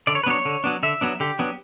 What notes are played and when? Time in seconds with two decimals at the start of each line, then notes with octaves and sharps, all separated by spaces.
0.07 D3 D5
0.15 C#5
0.23 B4
0.26 F#3 B3 D4 C#5
0.45 D3
0.64 F#3 B3 D4
0.83 D3 E5
1.01 F#3 B3 D4
1.20 D3 G4
1.39 F#3 B3 D4